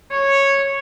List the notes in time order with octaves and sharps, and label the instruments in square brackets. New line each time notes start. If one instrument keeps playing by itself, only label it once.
[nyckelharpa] C#5